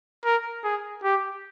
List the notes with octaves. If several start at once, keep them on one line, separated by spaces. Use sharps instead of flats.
A#4
G#4
G4